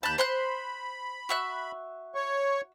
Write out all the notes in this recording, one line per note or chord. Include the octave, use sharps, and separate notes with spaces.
D#2 A5 B5 F#6 G6
C5 B5 C6 F#6
F#4 E5 F#6
C#5 C#6